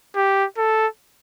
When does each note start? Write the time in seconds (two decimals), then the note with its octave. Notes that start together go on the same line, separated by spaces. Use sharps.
0.16 G4
0.57 A4